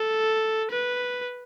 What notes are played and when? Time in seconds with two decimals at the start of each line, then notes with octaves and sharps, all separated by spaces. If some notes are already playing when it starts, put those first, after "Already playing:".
Already playing: A4
0.71 B4